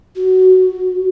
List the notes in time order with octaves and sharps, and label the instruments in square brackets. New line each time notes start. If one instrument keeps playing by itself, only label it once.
[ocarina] F#4